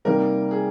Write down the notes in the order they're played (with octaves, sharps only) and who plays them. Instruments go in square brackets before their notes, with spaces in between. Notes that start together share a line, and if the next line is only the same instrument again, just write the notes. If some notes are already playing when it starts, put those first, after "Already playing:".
[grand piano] C3 G3 A#3 D#4 [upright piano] A#4
[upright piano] G#4